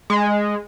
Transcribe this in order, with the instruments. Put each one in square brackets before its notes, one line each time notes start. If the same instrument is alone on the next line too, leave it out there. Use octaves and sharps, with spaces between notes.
[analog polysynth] G#3